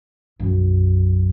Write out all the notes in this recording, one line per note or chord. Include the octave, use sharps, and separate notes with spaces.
B1 F#2